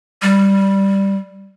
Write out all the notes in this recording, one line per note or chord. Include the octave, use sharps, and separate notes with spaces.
G3